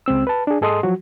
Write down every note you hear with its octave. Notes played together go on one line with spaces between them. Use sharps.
C#2 G#3 C4 E6
B4 A5
D4 G#4
G#2 G#4 A4 D#5 C6 D#6
F3 F#3 F#4